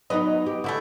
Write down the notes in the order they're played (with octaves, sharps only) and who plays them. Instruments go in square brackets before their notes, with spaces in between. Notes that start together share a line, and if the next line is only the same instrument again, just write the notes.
[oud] F#3 B3 D#4 [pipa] B4 D#5
[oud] G4
[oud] D3 [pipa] A3 E4 F#4